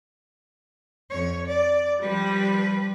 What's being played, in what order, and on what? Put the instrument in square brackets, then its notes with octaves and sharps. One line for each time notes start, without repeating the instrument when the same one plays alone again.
[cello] F2 C#5
D5
[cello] F3 B4 [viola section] G3